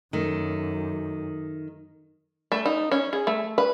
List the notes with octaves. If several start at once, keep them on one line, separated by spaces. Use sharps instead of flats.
F#2 D#3 A3
A3
D#4
C#4
G#4
A3
B4